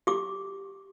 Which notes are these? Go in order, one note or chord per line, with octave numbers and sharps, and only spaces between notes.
G4 D6